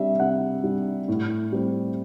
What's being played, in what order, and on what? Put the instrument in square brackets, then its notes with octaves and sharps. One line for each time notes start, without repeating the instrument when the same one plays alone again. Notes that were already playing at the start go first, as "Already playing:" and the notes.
Already playing: [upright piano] C3 G3 D4 E5
C3 F#5
G3 D4
A2
G3 C4